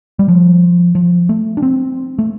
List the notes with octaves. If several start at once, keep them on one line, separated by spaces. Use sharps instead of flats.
G3
F3
F3
A3
D4
C4
A3